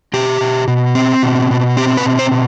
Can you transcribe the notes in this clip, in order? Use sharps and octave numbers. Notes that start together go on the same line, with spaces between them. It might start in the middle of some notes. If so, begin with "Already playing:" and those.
B2 G4
B2
B2
C4
B2
B2
C4 G4
B4
B2
C5
B2